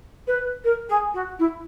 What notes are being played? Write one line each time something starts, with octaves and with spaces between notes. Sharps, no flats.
B4
A#4
G#4
F#4
E4